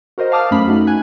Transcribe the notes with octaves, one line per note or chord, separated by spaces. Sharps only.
F#4 A#4 C5 D#5
F5 A5 D6 D#6 F6
F#2 A3 C#4 B5
A3 D#4 F#4
G#5 F#6